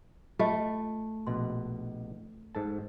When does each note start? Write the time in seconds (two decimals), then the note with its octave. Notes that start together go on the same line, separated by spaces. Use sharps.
0.39 A3 F4 D#5
1.27 A#1 B2 B4 C6
2.55 G#2 A4 A5